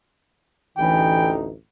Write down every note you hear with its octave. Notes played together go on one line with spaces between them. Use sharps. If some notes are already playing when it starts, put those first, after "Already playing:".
A1 D2 E3 D#4 G5